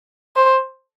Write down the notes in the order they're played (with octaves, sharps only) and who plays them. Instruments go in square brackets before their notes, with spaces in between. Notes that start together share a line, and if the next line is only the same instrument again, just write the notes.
[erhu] C5